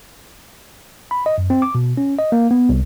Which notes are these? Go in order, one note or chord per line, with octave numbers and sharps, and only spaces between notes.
B5
D#5
F#2
C4
D6
B2
C#4
D#5
A#3
B3
C2